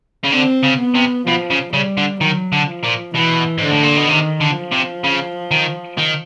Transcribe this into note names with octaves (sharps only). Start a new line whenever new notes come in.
C#3
D3 C4
C#3
B3
C3
B2 F3
C#3
C#3 G3
D3
D#3 F#3
D3
F3
A#2
B2 E3
G#2 D3
A2
A#2
B2
C3 D#3
D3
F3
C3
C#3
D#3
D#3